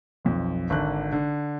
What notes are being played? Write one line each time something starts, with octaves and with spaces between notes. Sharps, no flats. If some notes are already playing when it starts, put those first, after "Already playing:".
B1 F2
G#1 D3 F#6
D3